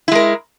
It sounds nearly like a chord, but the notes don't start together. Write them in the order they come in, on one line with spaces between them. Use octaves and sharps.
E4 G#3 A#4